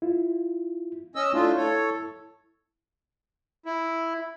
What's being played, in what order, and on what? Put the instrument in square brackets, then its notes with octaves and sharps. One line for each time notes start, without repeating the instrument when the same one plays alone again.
[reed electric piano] E4 F4
[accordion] C#4 D#5 E6
[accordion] A3 D4 F4 [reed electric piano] E4
[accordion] A4 C#5
E4